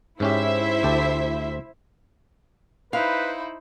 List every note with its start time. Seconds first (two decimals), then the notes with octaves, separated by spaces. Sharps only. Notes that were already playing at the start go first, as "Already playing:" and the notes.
0.20 G#2 C#4 E4 G4 C5 E5
0.83 D2 G4 A4
2.93 D#4 E4 B4 C5 F5